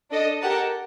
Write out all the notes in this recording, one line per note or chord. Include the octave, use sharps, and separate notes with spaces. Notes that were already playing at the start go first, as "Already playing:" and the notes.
D4 A4 D#5
G4 A#4 F#5 A5